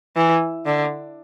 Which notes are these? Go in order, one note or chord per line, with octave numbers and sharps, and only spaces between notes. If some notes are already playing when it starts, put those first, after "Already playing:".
E3
D3